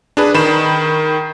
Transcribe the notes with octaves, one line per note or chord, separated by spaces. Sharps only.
D4 G#4 B4
D#3 B5 E7